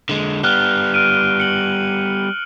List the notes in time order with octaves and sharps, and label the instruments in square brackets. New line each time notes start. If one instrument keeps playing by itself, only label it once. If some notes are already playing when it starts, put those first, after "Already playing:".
[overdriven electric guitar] D3 G#3
[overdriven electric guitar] G3 B3 [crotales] F6 F#6 G7
[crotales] F6 D7 D#7
C#7 F#7